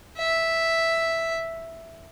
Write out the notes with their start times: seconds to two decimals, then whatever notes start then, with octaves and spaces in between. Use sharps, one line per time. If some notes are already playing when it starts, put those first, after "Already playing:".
0.19 E5